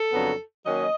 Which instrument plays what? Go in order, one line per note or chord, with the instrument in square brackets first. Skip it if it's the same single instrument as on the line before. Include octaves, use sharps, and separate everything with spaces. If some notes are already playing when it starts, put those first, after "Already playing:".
Already playing: [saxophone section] A4
F2 C#3 F#3 B3 D4
D#3 F#3 A#3 C#4 D#5